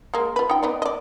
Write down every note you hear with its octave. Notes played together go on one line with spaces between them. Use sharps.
G#3 A#3
F4 B4
D#4 G5
B3 D#4 D5
D5 D#5